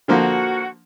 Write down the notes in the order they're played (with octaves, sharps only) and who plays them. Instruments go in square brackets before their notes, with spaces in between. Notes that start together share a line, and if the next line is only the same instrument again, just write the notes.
[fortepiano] D3 F3 A#3 [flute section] F#4